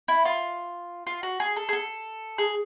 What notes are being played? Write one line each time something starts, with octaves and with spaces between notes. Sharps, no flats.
E4
F4
F4
F#4
G#4
A4
G#4
A4
G#4